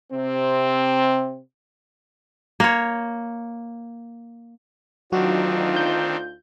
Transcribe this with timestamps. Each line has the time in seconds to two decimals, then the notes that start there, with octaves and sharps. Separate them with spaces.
0.12 C3 C4
2.60 A#3 C#5
5.12 D2 D#3 F#3 C4 D4 D#4 F4 F#4
5.76 G6